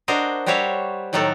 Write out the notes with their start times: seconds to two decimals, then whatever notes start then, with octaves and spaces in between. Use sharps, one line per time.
0.08 D4 F#4 A#4 C5 D#5
0.46 G3 F#4 C5 C#5 E5 F5
1.13 A2 D#3 F#3 F#4 A4